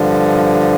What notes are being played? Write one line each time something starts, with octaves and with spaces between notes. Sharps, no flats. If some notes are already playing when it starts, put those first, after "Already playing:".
Already playing: G2 D3 F3